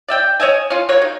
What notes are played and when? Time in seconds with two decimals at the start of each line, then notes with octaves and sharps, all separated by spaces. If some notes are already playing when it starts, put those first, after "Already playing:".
0.08 D5 E5 G5
0.40 C#5 D#5 E5 G#5
0.70 C#4 F4
0.89 F#3 A#3 C#5
1.02 D#4